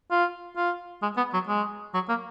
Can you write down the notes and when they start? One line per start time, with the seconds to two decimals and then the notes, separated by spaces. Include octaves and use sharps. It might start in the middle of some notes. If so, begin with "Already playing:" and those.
0.11 F4
0.57 F4
1.02 G#3
1.17 B3
1.33 F#3
1.48 G#3
1.94 F#3
2.09 A#3